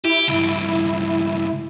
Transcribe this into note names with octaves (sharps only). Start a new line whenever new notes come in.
E4 G4
C#2 G2